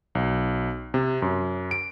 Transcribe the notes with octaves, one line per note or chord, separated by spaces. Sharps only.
B1
C3
F#2
D7